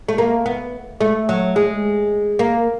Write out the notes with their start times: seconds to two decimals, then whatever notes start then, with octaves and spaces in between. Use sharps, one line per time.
0.09 A3
0.18 A#3
0.46 B3
1.01 A3
1.29 F#3
1.56 G#3
2.39 A#3